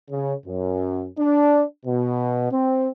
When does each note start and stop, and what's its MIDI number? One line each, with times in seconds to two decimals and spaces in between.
0.10 0.34 49
0.47 1.07 42
1.19 1.64 62
1.86 2.51 47
2.52 2.89 60